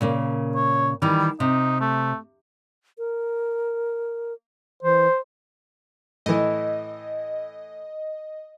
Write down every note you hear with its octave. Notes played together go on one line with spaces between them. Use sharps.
A#2 C#3 A#3
C#5
D#3 E3 G3
C3 D#4
A3
A#4
E3 C5
A2 E3 D#5